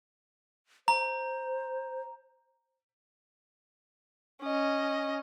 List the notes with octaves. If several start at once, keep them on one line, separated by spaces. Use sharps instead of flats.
C5 A#5
C#4 D#5